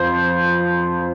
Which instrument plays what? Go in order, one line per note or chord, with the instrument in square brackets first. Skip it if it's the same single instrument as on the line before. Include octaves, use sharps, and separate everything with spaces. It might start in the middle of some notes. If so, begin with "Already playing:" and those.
Already playing: [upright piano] F2 F3 C5